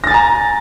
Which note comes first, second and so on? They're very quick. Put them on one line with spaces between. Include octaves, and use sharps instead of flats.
A#6 A6 G#5 A#5